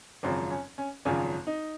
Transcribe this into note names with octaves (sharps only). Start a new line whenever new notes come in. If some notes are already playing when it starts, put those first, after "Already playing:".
G#1 F#2 C#3 F3 C4
C#4
C#4
G#1 F#2 C#3 F3 C#4
D#4